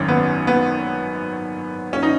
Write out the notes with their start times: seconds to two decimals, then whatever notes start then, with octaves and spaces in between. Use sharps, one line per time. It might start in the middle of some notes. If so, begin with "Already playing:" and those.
Already playing: G#1 F#2 D#3 C#4
0.08 B3
0.47 B3
1.93 C#4
2.03 D#4